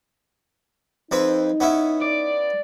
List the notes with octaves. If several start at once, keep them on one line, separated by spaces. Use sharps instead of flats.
F2 C4 D#4 B4
B3 C#4 E4
D5